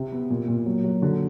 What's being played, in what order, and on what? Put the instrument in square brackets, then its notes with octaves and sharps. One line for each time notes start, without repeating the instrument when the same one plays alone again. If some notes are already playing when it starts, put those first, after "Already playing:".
Already playing: [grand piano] C3
B3
A#2
A#2
F#3
F#3
D3